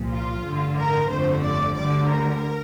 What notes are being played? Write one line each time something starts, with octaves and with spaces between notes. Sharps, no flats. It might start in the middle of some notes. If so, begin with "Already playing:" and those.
Already playing: C2 A#2 F3
F4
A1 G2 D3
A#4
G1 F2 D3 F3 A3 C5
D5
D2 D3 G3 D5
A#4